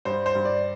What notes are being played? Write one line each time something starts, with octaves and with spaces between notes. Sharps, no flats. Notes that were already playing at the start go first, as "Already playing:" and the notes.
G2 C5
C5
G2
D5